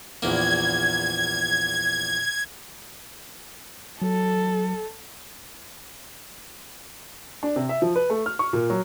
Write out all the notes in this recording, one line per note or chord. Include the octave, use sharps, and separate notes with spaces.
A#1 E2 A#3 G#6
F#3 A4
D4
C3
E5
F3
B4
A3
F6
C#6
A#2
F#3